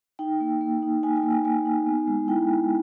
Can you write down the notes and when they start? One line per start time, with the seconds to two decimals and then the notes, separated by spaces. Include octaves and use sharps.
0.19 D#4 G5
0.40 A#3
0.61 A#3
0.83 D#4
1.03 D#4 G#5
1.17 G5
1.23 A#3
1.31 G#5
1.45 A#3 G#5
1.66 D#4
1.86 B3
2.07 G#3
2.28 E4 G5
2.48 G#3